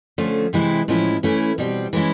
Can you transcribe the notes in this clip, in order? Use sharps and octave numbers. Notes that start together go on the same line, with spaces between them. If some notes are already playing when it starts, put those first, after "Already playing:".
D3 F3 A3 C#4
C3 E3 G#3 C4 E4
A2 F3 G#3 C#4 E4
E3 A3 C#4 E4
B2 G3 C4
E3 G#3 C#4 E4